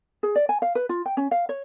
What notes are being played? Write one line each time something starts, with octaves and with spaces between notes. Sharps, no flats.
G#4
D5
G#5
F5
B4
F4
G5
C#4
F5
C#5